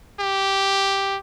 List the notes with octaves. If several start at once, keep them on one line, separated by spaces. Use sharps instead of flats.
G4